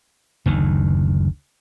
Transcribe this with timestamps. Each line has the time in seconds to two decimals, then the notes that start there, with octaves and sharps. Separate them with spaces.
0.46 F#1 D2 D#3